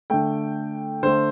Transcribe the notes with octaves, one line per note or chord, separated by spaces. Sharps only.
D3 A3 G5
D3 A3 C5